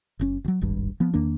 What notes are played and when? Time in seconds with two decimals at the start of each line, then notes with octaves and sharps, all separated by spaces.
0.19 F#1 C#3 C#4
0.44 D2 F#3
0.61 D#1 G#1 G2
1.00 F3 B3
1.14 E2 D#3 A#3 D4